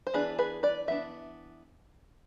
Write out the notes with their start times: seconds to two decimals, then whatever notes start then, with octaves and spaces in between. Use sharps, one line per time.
0.07 C5
0.14 E3 B3 D4 G#4 B4
0.38 G#4 B4
0.63 B4 D5
0.88 E3 B3 D4 E5